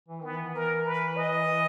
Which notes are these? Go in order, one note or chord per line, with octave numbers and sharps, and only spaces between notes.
E3
D#3 B3
E3
E3 A#4
B4
D#5